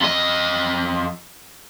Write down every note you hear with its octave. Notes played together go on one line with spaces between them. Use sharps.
F2 D#5